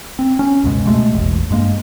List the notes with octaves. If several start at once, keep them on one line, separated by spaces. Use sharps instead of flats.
C4
C#4
C#2 F#2 B2 G#3
B2 G#3 A3
E1 A1
G2 G#3 A#3